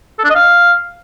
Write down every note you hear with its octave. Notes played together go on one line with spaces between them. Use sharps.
A4
D4
D#5
F5